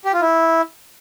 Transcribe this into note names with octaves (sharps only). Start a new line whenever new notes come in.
G4
F4
E4